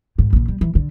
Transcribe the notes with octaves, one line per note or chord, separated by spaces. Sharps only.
D2 G#2
A#1 C#3
G3
E3
D3